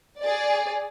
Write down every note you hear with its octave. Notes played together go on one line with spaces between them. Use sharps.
G#4 D5